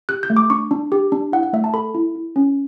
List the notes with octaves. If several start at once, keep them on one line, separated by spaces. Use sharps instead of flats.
G4 F#6
G6
A3
D6
D4 C#6
D4
G4
D4
E4 F#5
F#5
A3 E5
A5
A4 B5
E4
E4
C#4